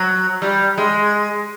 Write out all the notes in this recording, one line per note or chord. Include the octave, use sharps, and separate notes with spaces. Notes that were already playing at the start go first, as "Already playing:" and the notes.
Already playing: F#3
G3
G#3